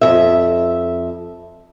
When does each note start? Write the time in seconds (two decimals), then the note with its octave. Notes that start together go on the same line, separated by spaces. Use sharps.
0.01 F2 B2 E5